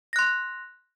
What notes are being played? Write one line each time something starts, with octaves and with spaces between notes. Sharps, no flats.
C6 F#6 A#6